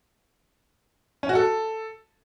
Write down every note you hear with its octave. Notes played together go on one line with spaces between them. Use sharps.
C#4
F#4
A4